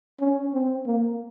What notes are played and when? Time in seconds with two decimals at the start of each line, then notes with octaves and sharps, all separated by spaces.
0.20 C#4
0.54 C4
0.86 A#3